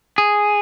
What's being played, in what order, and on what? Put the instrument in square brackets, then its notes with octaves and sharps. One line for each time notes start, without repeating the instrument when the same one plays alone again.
[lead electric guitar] G#4